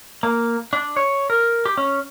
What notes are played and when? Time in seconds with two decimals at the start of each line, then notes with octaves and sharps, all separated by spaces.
0.23 A#3
0.73 D4
0.97 C#5
1.30 A#4
1.65 G4
1.77 C#4